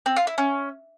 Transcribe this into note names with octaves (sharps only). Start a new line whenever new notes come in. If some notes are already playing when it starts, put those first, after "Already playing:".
C4
F4
E4
C#4